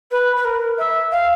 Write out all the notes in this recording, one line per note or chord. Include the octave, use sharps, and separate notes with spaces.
B4
B4
A#4
E5
F5